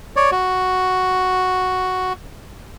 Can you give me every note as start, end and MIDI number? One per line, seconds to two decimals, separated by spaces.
0.16 0.31 73
0.16 0.31 74
0.32 2.13 66